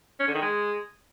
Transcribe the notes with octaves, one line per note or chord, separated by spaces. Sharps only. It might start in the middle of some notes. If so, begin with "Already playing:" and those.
C#4
D3
D#3
G#3